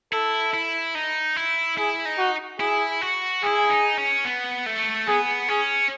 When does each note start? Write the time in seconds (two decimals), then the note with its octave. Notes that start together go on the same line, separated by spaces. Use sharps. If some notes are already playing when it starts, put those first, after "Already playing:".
0.13 E4 A4
0.54 E4
0.95 D#4
1.36 E4
1.78 E4 G#4
2.05 D#4
2.18 F#4
2.60 E4 G#4
3.01 F#4
3.43 E4 G#4
3.70 D#4
3.97 C#4
4.25 B3
4.66 A3
5.08 B3 G#4
5.48 C#4 G#4